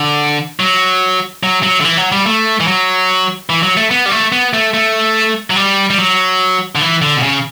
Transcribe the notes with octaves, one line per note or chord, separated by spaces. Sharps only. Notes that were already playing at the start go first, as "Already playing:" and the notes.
Already playing: D3
F#3
F#3
F#3
D3
E3
F#3
G3
A3
E3
F#3
E3
F#3
A3
B3
G3
A3
B3
A3
A3
F#3
G3
G3
F#3
D3
E3
D3
B2
C#3